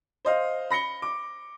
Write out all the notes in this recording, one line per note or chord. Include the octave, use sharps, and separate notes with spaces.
C5 D#5 F5
B5 A#6 C#7 G7
D6